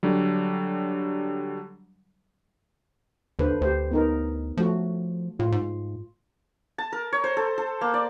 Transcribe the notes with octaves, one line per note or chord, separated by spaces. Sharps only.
D3 F#3 G3
D#2 D3 B4 C5
D2 G4 C5
B3 D#4 A#4
F3 A3 F#4
A2 F4
G#2
A5
A#4
C#5
C5
A4
A4
A#3
D5